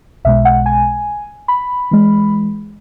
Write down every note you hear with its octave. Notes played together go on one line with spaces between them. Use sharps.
B1 B2 G#3 E5
F#5
G#5
B5
E3 G#3